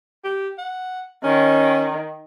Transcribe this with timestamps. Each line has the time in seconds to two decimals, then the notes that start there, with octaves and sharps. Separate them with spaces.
0.24 G4
0.58 F#5
1.24 D#3 C#4